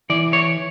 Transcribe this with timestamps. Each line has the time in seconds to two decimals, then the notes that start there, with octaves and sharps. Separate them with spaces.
0.10 E3 D5
0.33 C#5